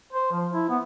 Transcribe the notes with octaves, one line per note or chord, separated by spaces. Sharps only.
C5
F3
E4
B3